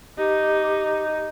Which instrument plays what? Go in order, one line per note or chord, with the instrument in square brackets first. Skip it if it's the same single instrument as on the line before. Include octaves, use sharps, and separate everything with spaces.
[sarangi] D#4 [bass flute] G4